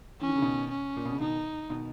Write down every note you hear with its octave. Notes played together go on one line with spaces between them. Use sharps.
E3 C#4
D#3
C#3
B2 D#3
C#4
A#2
B2
C#3
B2 D#3 D#4
B2 D#3